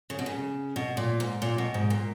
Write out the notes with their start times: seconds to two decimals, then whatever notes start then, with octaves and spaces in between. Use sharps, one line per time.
0.10 C#3
0.19 B2
0.26 C#3
0.76 B2
0.97 A#2
1.20 G#2
1.42 A#2
1.58 B2
1.74 G#2
1.90 A#2